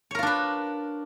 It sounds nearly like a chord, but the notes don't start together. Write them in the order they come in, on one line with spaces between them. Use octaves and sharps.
C#5 A#4 F4 D4 B4